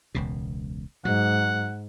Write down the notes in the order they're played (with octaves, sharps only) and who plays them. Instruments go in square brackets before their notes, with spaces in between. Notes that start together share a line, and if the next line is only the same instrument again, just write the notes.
[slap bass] E1 C#2 B2
[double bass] G#2 [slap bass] F#3 [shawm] F#5